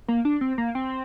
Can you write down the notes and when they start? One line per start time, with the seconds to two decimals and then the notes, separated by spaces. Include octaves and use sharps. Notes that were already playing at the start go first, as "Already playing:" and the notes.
0.08 A#3
0.25 D4
0.41 C4
0.58 A#3
0.75 C4